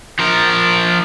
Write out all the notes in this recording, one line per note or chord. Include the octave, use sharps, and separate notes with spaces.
F3 A#4